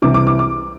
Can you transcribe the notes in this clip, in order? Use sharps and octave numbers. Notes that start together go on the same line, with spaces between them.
C2 C3 E3 D6
D6
D6
D6